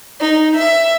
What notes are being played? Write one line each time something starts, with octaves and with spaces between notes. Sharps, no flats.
D#4
E5